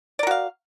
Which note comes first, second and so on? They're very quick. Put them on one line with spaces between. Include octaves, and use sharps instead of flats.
D5 A#4 F#4 F5